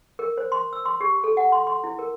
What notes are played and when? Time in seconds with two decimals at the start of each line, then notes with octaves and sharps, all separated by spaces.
0.19 A#4
0.38 C5
0.52 C6
0.73 E6
0.85 C6
1.01 G4
1.24 A4
1.37 F#5
1.52 C6
1.67 C6
1.84 E4
1.99 A#4